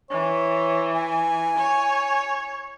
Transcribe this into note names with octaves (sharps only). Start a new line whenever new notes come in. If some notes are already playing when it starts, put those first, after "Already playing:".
E3 C#5
G#5
C#5